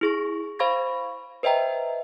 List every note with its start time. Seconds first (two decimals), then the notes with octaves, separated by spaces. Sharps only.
0.01 E4 G#4 C#6
0.59 C5 F5 B5 C#6 G#6 A#6
1.43 B4 C5 D#5 E5 G5 A#5